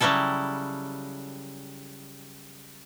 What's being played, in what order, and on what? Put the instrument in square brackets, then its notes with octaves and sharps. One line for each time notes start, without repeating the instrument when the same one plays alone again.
[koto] C#3 F#3 G3 E4 A4